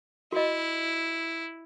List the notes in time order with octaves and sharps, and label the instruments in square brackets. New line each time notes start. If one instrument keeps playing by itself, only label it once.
[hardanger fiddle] E4 [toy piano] F#4 D#5